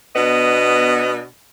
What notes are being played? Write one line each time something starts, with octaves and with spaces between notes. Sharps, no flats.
B2 B3 D4 D#5